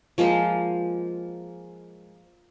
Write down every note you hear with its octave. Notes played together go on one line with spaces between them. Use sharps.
F3 G#3 A#3 C5